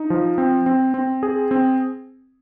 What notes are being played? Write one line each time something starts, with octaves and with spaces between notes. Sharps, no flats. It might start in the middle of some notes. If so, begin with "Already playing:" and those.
Already playing: D#4
F3
C4
C4
C4
G#4
C4